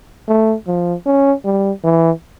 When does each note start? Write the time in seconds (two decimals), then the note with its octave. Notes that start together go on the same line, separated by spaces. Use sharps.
0.28 A3
0.67 F3
1.06 C#4
1.45 G3
1.84 E3